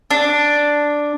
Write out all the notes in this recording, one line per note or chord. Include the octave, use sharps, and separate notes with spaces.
D4